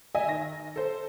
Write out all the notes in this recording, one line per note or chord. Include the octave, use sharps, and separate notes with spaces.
D#5 E5 G#5
D#3 A#6
A4 C5